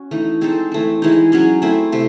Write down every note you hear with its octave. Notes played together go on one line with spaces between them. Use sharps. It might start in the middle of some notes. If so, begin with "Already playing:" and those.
Already playing: C#4 F#4
E3 A3 D#4
G#3 C4 D#4 A4
E3 A3 C4
E3 G#3 D#4
F#3 C#4 G#4
A3 C4 E4
C3 A3